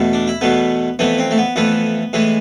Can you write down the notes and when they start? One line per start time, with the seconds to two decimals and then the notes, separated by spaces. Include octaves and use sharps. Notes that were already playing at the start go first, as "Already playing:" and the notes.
Already playing: E2 B2 A3
0.13 D4
0.28 E4
0.41 E2 B2 A3 B3
0.99 F2 E3 A3 B3
1.19 C4
1.31 A3
1.38 B3
1.56 F2 E3 A3 B3
2.13 A2 E3 G#3